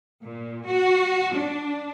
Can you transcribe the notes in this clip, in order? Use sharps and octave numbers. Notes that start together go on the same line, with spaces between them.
A#2
F#4
D4